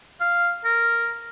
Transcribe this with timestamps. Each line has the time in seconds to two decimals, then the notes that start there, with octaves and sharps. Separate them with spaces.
0.20 F5
0.64 A#4